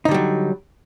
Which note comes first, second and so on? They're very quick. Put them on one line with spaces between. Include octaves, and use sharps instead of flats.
D#4 D3 G3 F#3